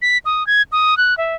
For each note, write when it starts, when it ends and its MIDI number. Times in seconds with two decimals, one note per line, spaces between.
0.02 0.18 95
0.25 0.46 87
0.47 0.62 92
0.72 0.97 87
0.97 1.17 90
1.18 1.35 76